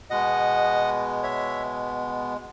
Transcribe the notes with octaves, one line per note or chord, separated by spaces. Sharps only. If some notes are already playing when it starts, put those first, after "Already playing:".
B2 G#3 B3 D#5 F#5
C#5 E5